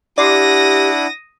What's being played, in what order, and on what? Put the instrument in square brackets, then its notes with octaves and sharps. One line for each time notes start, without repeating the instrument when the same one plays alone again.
[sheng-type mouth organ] D4 E4 F#5 [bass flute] G4 [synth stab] D5 C6 [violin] D#6 A#6